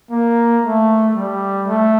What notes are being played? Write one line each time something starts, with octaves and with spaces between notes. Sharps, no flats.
A#3
A3
G3
A3